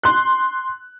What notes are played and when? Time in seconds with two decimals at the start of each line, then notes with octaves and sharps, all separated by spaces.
0.03 C6 F#6